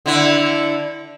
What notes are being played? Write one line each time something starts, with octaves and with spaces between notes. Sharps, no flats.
D3 E4